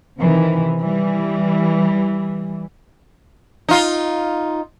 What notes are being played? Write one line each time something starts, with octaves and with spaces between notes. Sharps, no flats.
C3 D#3 E3
E3 G3
D#4 F4